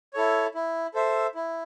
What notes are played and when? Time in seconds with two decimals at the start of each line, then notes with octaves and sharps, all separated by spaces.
0.14 E4 A4 C#5
0.55 E4
0.94 A4 C5 E5
1.35 E4